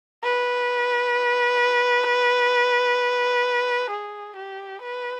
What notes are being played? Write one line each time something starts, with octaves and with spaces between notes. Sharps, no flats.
B4
G#4
G4
B4